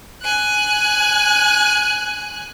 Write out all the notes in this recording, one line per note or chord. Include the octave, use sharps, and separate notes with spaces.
G#5 F#6